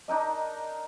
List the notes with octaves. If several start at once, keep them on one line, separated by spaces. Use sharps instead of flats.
D4 D#4 A#4 D#5